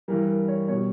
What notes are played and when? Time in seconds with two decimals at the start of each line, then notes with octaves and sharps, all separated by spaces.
0.08 G2 E3 G3 A#4
0.29 A#4
0.48 C#5
0.68 B2 G3 C#5